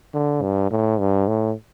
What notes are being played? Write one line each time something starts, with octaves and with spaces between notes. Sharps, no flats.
D3
G2
A2
G2
A2